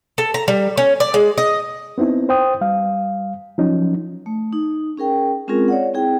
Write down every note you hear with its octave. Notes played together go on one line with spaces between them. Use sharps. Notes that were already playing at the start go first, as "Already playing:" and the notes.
A4
A#5
G3
C#4
D5
G#3
D#5
B3 C4 D#4 E4
C5 G5 D#6
G3 F5
F3 F#3 C#4 D#4
A3
D#4
C#4 G#4 A#4 G5
G#3 C4 C#4 F4 G#4 A#4
C#5 D5 F#5
C4 E4 G#4 G5